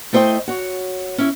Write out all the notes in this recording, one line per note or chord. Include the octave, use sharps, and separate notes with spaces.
A3 E4 C5 D#5 G5
F#4 C#5
C#4 E4